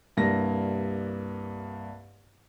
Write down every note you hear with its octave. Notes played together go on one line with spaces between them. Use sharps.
C2 G2 A#3 A#6